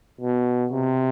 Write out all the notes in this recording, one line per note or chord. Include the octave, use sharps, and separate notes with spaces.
B2
C3